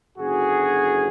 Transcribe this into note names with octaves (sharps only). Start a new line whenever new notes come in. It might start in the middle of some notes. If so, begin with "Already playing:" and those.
F#1 F#2 D3 F#4 G#4